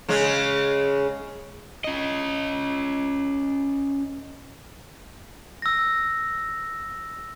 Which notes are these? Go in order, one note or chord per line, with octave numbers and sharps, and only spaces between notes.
C#3 G#3 C#4
C#4 D#5
E6 A#6